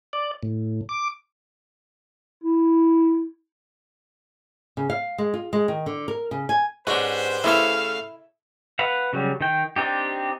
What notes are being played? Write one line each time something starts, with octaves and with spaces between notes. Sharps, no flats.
D5
A2
D6
E4
C#3
F5
G#3
F4
G#3
D#3
D3
A#4
C#3
G#5
G#2 C#4 D4 F#4 G4 B4 C5
C#3 A3 E4 A4 F5
B4 F5 F#5
C#3 F#3 G3
D#3 G5
C4 D4 D#4 G4